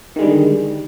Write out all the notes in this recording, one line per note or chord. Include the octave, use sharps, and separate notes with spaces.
D3 D#3 G3 G#3